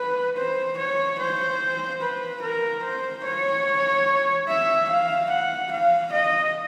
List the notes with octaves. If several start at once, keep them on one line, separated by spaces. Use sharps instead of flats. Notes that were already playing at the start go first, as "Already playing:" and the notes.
Already playing: B4
C5
C#5
C5
B4
A#4
C5
C#5
E5
F5
F#5
F5
D#5